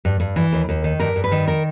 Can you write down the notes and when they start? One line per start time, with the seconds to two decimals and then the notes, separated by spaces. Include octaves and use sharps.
0.05 G2
0.20 G2
0.36 E3
0.53 D#2
0.69 D#2
0.84 D#3
1.00 G2 A#4
1.16 G2
1.24 B4
1.31 D#3
1.48 A#4